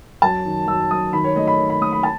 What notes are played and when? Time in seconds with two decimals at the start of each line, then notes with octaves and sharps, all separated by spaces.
0.22 F#2 A5
0.45 D#3
0.67 F#2 E6
0.90 F#2 D#6
1.13 D#3 B5
1.24 C#5
1.36 A3 D#5
1.47 B5
1.59 D#3
1.70 B5
1.81 A3 D#6
1.93 B5
2.03 A5